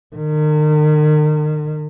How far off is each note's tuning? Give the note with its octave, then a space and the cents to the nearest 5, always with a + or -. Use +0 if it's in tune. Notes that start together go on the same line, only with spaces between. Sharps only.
D#3 -40